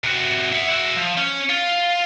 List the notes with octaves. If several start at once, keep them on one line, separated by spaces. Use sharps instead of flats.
C3 F#4
E5 F#5
E4 F#4
F3
C#4
F4